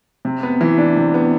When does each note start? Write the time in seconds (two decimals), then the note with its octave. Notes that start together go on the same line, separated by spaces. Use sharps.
0.25 C3
0.43 B3
0.61 E3
0.78 D4
0.96 C3
1.14 B3